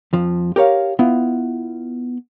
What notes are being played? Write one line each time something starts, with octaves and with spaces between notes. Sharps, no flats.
F2 F3
G4 A#4 C#5 F5
B3 E4 F4